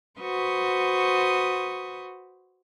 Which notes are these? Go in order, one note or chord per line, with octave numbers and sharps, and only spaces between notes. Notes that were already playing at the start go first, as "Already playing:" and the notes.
F#4 B4 C5 C#6 D#6